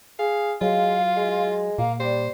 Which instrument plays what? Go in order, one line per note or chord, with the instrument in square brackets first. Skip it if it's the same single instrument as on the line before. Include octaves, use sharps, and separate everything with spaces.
[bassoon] G#4 [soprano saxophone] F5
[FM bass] F#3 [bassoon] G#3 [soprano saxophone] F4 [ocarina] F5
[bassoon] G#3
[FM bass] A#2 [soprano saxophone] A#3 [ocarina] F5
[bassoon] G3 [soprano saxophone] C5 [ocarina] D5